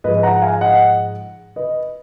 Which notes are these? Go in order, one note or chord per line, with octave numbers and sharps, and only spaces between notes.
G#2 F3 G#3 B4 D#5
F#5 A#5
F5 G#5
D#5 F#5
B4 D#5